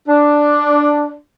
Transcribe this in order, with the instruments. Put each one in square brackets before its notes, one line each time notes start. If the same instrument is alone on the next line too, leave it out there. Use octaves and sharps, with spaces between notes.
[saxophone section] D4